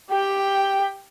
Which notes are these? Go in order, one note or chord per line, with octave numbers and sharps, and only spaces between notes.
G4 G5